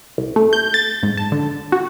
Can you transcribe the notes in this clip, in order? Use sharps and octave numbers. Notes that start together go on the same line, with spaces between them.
C2
A3
G6
A6
G#2
A5
D3
F#4